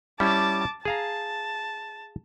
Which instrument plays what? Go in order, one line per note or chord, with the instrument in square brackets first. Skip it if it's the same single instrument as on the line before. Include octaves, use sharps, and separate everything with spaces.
[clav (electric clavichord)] G3 C#4 E4 [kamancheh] A5 D6
[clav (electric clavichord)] G#4 F5 A#5 [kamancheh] A5